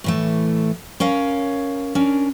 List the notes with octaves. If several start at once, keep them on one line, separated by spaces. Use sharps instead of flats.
A2 E3 A3
C#4 A#4 C#5 F5
C#4 D4 A#4